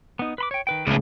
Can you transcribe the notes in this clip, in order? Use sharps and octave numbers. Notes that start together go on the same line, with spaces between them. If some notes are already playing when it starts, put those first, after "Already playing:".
B3 D#4
B4 B5 D6
C#5 G5
D#3 B4 G5
C#2 A2 C#3 B4